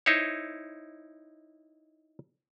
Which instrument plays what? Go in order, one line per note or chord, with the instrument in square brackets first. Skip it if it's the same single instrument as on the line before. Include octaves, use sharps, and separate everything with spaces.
[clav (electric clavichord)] D#4 E4 C5 C#5